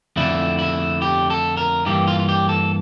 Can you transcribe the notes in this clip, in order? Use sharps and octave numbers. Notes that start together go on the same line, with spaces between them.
F2 D3 A3 E4
E4
G4
A4
A#4
G2 E3 A#3 G4
F4
F4
G4
A4